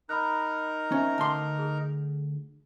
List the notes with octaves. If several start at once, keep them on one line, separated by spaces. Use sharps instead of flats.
D#4 A#4 A#5 B5 F6 F#6
C#4 C5 E5
D2 A5 C6 D6
G#4